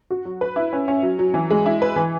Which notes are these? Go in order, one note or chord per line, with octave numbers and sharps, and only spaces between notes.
F#4
F#3
B4
E4
C#4
C#4
F#3
F#3
E3
G#3
E4
B4
E3